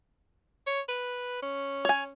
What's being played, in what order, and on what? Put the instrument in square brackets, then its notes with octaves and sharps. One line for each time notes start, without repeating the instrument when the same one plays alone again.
[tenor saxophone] C#5
B4
C#4
[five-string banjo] C#5 G#5